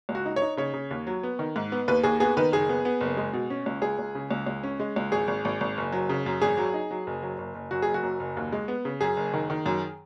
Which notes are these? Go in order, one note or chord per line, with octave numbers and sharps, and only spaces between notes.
C#2
F#4
D#4
C#5
D#4
C#3 C#5
C#3
D#2
F#3
B3
D#3
G#2
B3
D#2 B4
D#2 G#4
B3 G#4
D#3 B4
F#1 G#4
B3
B3
F#1
G#3
B2
C#4
C#2
C#2 G#4
C#2
C#3
C#2
C#2
C#4
G#3
C#2
G#1 G#4
G#1
G#1
G#1
F#1
F#3
C#3
F#2
G#1 G#4
F#3
D#4
F#3
F#1
F#3
F#1
F#1
F#2 F#4
F#1 G#4
F#4
F#2
F#1
D#2
G#3
B3
C#3
F#2 G#4
F#1
D#3
D#3
F#2